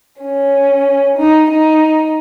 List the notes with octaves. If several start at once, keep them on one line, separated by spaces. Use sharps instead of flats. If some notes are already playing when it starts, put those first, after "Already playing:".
C#4
D#4
D#4